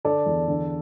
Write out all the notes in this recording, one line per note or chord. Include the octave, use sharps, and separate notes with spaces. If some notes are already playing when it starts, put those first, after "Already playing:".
D3 A4 D5
E2
D3